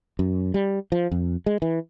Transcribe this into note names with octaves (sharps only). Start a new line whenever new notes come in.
F#2
G3
F3
F2
G#3
E3